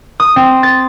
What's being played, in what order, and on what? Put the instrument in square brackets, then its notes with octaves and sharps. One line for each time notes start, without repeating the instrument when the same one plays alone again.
[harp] D#6
C4
A6